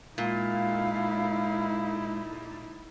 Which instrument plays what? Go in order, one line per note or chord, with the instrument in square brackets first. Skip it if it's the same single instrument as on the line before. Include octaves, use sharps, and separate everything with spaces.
[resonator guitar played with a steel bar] A#2 [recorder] G#3 [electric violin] D#4 E4 [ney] F5